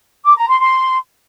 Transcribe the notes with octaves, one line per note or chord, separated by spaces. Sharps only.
D6
A#5
C6
C6